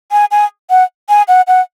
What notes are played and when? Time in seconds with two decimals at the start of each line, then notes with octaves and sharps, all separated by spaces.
0.12 G#5
0.31 G#5
0.70 F#5
1.09 G#5
1.28 F#5
1.47 F#5